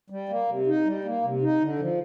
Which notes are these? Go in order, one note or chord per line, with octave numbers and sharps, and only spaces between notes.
G3
A#3
C3
D#4
G3
A#3
C3
D#4
D3
F3